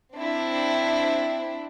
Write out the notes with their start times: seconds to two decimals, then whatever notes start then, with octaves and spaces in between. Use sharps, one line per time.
0.14 C4 D4 E4